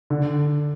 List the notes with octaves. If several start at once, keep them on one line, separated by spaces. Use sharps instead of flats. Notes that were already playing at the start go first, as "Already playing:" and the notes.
D3